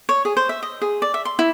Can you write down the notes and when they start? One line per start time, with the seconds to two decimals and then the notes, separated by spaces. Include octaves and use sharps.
0.09 C#5
0.25 G#4
0.37 C5
0.49 E5
0.63 D#5
0.82 G#4
1.02 D5
1.14 E5
1.25 C6
1.39 E4